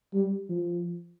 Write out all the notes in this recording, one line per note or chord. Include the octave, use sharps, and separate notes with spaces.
G3
F3